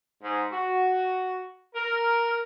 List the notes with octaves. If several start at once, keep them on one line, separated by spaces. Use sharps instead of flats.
G#2
F#4
A#4